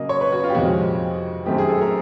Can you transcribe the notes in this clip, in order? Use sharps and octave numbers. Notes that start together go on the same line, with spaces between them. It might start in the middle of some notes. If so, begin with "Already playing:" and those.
Already playing: C#3 F#3 A#3 D#5
C#5
B4
F#4
F4
G4
F2 C3 D#3 G#3 C4 F#4
F#2 D#3 F#3 A3 C4 G4
G#4
A4
A#4